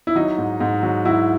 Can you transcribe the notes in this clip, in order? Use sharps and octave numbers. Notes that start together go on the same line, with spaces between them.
E4
F#3 D#4
G#2
G#2
F#3
F#3 E4